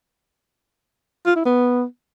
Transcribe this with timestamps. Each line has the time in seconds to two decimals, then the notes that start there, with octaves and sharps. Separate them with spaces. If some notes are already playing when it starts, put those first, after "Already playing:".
1.27 F4
1.36 E4
1.46 B3